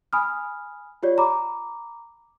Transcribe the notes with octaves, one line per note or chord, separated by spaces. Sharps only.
G#5 B5 D#6 F6
F4 G4 C#5 D5
A#5 B5 D6